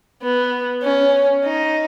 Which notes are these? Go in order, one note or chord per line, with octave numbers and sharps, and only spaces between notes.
B3
C#4
D#4